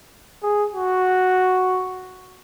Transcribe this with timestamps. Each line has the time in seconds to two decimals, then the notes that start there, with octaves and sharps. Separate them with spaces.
0.43 G#4
0.74 F#4